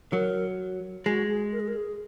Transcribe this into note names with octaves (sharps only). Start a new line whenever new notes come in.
F#3 A#4
G#3 F#4
G#4
A#4
G#4
A#4
G#4